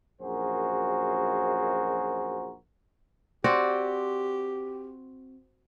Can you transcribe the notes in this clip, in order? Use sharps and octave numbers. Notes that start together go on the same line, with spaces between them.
A#1 F#2 F#4 G#4 A#4 C5
C4 F#4 G4 D5